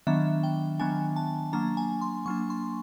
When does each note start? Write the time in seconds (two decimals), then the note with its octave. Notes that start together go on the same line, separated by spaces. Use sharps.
0.07 D#3 F#3 B3 D4 E5
0.43 G5
0.79 D#3 F#3 B3 D4 G#5
1.16 A5
1.53 F#3 A#3 D4 A#5
1.77 G#5
2.01 C6
2.26 F#3 A#3 D4 C#6
2.50 C6